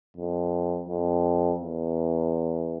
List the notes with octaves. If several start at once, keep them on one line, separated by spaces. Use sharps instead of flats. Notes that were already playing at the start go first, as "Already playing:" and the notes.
F2
F2
E2